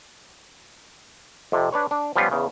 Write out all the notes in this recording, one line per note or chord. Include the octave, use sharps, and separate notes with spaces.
F2 C3
D4 B4 C#5
D4
F3 G3 B3 C#4 F4
E2 C#3